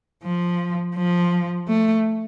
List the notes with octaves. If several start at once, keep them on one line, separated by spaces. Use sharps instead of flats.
F3
F3
A3